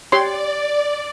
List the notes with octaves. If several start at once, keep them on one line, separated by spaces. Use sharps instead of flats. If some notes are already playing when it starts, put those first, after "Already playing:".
G4 C#5 D5 C6